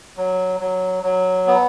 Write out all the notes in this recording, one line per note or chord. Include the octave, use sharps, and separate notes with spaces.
F#3
F#3
F#3
B3